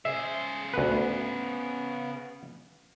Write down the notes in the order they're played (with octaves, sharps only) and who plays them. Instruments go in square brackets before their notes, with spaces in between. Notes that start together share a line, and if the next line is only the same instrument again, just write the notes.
[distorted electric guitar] C#3 C5 [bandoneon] G#4 [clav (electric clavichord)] E5
[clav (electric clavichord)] D2 B4 [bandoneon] B3